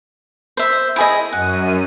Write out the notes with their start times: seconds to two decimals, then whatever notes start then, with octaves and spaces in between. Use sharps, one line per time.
0.57 C5 E5
0.96 E4 G#4 D#5
1.33 F#2 F#5 D#7